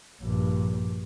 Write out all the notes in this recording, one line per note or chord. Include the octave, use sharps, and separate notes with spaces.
A#1 G2